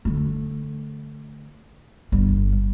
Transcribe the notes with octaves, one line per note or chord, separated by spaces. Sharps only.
D3 A3
G1 G3